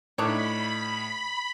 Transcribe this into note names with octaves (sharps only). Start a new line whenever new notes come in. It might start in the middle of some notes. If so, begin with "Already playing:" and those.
A2 D4 D#4 C#5 B5